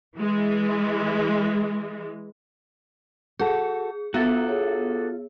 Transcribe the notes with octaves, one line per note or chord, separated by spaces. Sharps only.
E3 G#3
F#4 G#4 A4
B3 F4 F#4 A4 E5 A6
G#4 C#5